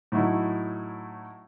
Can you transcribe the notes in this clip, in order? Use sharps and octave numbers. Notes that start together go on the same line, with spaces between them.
A2 F#3 D#4 E4